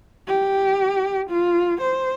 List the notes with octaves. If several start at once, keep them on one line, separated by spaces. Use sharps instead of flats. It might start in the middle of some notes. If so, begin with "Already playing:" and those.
G4
F4
C5